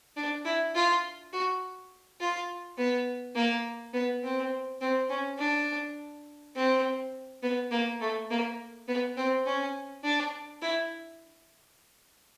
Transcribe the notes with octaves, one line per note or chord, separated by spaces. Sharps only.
D4
E4
F4
F#4
F4
B3
A#3
B3
C4
C4
C#4
D4
C4
B3
A#3
A3
A#3
B3
C4
C#4
D4
E4